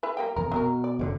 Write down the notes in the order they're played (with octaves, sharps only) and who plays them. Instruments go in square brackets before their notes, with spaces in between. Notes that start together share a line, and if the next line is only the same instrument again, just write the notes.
[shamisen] E4 G#4 B4
G3 A#3 G5
[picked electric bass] E1 F2 [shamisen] A#4
[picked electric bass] B2 [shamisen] F#3 G4 A#4
[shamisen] D5
[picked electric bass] F#1 B2 D3